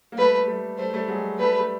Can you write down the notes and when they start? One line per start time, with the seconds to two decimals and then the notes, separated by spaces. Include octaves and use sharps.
0.12 A#3
0.18 G3 A3 B4
0.47 G3 A3
0.78 G3 A3 C5
0.94 G3 A3
1.08 F#3 G#3
1.38 G3 A3 B4
1.60 A3